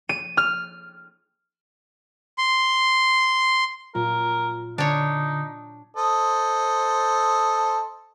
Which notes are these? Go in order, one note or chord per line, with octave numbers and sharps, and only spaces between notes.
D#7
F6
C6
A#2 F#3 F4 A#4
D3 D4 D#4 C#5
A4 C5 D#5